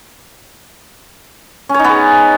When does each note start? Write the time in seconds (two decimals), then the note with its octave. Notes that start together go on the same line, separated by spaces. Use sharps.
1.69 C#4
1.74 C#5
1.79 D#4
1.84 B3
1.89 G#4